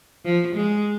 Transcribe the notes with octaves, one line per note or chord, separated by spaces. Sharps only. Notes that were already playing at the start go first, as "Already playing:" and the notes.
F3
G#3